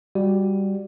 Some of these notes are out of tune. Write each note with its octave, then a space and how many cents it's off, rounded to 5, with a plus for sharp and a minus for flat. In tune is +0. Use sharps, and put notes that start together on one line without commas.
G3 +5 F#4 +0